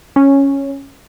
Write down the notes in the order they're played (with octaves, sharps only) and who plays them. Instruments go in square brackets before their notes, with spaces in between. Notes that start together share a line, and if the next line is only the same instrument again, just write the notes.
[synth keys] C#4